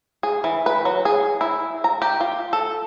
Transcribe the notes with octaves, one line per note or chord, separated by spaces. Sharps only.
G#4
E3
B4
F#3
G#4
E4
A#5
G4
F4
A4